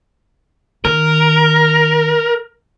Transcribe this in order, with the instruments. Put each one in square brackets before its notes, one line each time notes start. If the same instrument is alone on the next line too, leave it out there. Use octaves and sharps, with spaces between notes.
[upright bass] D#3 [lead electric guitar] A#4